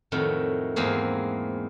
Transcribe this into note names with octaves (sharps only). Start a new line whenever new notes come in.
F2 A2 D#3 F#3
E2 G#2 A#3 C4 G#4